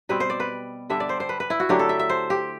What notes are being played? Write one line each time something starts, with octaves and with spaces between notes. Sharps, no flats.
B2 G3 C4 B4
C5
D5
B4
D3 G3 D4 E5
D5
C5
C5
B4
B4
E4
F#4
D3 F#3 A3 D4 G4
A4
E5
E5
C5
G4